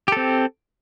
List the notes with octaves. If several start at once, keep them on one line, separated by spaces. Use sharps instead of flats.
C4 G4 A4